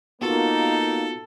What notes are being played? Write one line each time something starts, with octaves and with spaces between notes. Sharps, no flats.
A#3 B3 D#4 F4 F#4 A4